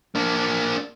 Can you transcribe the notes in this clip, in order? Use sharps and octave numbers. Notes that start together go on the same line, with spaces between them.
A#3 D4